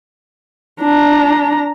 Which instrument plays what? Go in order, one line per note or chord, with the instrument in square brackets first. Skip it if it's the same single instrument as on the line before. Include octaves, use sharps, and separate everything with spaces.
[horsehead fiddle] D4 A#5